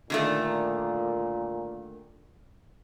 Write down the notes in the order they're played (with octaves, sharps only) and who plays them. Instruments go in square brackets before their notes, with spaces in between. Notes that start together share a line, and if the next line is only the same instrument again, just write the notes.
[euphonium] A#2 [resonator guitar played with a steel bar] D3 D#3 A3